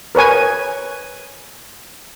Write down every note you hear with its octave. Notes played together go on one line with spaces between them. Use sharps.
A#4 B4 C#5 G#5